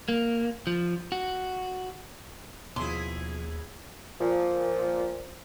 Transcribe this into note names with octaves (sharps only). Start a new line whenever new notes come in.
A#3
F3
F#4
D#2 B2 F3 C#4 E4 G#4 C6
A#2 F3